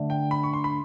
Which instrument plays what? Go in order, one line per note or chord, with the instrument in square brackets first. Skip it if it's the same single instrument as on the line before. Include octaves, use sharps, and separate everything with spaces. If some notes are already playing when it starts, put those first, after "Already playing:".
Already playing: [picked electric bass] D3 A3 D4
[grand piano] G5
B5
C#6
C6
B5